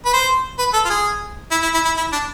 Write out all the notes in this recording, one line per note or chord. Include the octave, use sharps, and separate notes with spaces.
B4
C5
B4
A4
F4
G#4
E4
E4
E4
E4
E4
D4